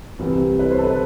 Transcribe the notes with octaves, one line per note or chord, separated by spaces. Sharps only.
C2 C3 E3
B4
C5
A4
B4